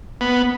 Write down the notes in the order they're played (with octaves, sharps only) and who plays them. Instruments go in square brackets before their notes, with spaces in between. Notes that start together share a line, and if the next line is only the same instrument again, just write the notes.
[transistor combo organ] B3